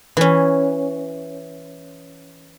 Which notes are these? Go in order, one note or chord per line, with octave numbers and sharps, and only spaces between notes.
E3 C#4